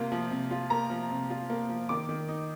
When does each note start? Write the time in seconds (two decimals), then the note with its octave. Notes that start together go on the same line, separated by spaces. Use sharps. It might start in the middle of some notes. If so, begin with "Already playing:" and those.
Already playing: C3 A#3 F4
0.12 F3
0.31 C3
0.51 F4
0.70 A#3 A#5
0.90 F3
1.11 C3
1.30 F4
1.50 A#3
1.69 F3
1.89 D#3 D6
2.09 D#3
2.29 D#4